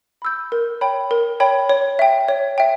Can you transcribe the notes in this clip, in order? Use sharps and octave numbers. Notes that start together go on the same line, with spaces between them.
B5 E6 G6
A#4
C#5 G5 B5
A#4
C#5 G5 B5
C#5
E5 G5
C#5
E5 G5